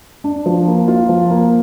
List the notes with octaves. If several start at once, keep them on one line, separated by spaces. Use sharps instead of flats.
D4
F3
A#3
F4
F3
A#3